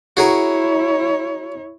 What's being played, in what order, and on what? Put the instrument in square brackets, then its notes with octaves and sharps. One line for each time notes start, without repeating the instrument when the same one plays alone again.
[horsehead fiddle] E4 C#5 [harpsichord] F#4 G#4 A#4